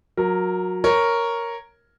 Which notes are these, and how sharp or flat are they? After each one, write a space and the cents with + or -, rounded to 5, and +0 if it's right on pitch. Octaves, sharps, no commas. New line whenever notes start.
F#3 -20 A#4 +0
A#4 +0 C#5 +0